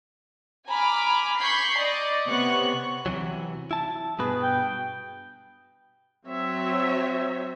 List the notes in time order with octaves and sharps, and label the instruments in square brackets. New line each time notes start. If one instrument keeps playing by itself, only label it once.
[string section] G#5 A#5 B5 D6 F6
B5 C#6 G6 G#6 B6 C7
D5 D#5
C3 B3 C#5 C#6 F#6
[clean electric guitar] C3 E3 F#3
E4 A5
[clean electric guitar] G2 B2 B4 [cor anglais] G#4
[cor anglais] G5
[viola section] F#3 C#5 E5 [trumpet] C4